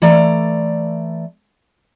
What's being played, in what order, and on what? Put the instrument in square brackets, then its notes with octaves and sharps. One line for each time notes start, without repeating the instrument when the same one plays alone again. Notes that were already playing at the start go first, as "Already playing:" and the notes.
[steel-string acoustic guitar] E3 A3 D5 A#5